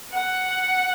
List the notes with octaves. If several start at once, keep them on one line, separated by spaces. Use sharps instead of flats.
F#5